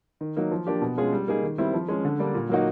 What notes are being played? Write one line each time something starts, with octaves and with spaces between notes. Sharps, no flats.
D#3
F#3 A#3 D#4
F3
A#3 D4 G4
B2
G#3 C#4 F4 G#4
G3
A#3 D#4 G#4
D#3
G3 C4 E4
F3
G#3 C#4
D3
G3 A#3 D4
A#2
F#3 A#3 D#4 F#4